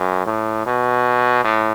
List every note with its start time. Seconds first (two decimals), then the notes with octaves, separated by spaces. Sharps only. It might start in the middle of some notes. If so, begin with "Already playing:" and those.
Already playing: F#2
0.26 A2
0.66 B2
1.44 A2